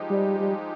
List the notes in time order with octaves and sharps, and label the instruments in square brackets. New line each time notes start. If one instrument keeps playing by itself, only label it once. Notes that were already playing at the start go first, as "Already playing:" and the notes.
Already playing: [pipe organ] F3 G#3 D#4 G4
[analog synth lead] G3
G3